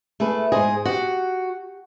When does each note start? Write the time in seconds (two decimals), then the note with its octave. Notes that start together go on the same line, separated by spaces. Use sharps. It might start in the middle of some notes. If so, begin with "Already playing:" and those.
0.20 A3 G#4 B4
0.52 G#2 G#4 C5 D#5
0.85 F#4 G4 F#5